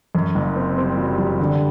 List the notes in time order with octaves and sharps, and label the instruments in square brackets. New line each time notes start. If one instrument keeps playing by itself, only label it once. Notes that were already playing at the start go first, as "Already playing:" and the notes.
[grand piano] F#2
F#1
C4
[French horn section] G3 [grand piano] C4
[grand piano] F#3
F#3
D3